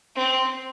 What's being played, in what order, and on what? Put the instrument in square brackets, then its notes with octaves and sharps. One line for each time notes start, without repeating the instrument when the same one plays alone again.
[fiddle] C4